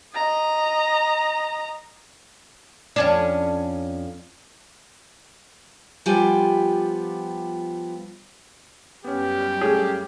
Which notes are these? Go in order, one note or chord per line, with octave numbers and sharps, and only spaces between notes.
D#5 A#5
F2 C#4 D4
F3 G3 B3 F4 G4 G#5
F#2 G3 B3 C#4 G4
A3 C#4 G#4